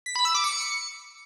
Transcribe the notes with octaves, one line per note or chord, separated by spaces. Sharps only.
B6
B5
E6
D6
C#7